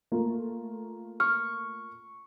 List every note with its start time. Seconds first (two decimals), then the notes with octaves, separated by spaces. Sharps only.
0.12 A3 A#3 F4
1.20 C#6 F6